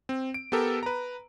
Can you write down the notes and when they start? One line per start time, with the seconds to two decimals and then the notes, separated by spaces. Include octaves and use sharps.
0.09 C4
0.34 D7
0.52 B3 G4 A4 A#4
0.83 B4 A#5